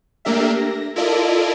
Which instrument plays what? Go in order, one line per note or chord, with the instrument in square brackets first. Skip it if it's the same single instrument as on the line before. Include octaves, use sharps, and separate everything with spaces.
[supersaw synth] A3 A#3 D4 G4 A#4 E5
A#6
E4 F4 A4 A#4 D5 D#5